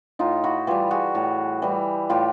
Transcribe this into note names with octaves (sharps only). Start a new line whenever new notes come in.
A2 D#4 F4
E4 F#4
E3 G3 F4 G4
F#4 G#4
A2
E3 G3
A2 F4 G4